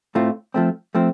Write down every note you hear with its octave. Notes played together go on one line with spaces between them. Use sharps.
A2 A3 C4 F4
F3 A3 C4
F3 A3 C4